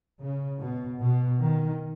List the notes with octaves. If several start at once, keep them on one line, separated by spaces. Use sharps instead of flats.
C#3
B2
B2
D#3